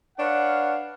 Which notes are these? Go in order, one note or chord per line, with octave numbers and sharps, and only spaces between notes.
D4 B4 C#5 F5 F#5